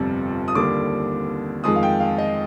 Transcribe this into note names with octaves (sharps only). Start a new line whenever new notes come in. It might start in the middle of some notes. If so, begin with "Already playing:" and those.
Already playing: G1 F2 C3 G3
D#6
D#2 D3 G3 D6
F2 D#3 G#3 D#6
F5
G5
F5
D#5